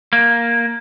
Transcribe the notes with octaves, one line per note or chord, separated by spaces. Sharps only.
A#3